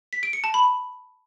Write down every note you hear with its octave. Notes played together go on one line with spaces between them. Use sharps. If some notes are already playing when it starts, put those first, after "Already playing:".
B6
D7
C#7
A5
B5